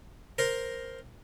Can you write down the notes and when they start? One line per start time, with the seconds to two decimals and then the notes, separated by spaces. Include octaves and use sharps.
0.39 A#4 C5